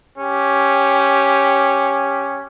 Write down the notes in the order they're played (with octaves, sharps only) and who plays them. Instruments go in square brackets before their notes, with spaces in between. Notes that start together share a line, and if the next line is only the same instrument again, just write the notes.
[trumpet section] C#4 G4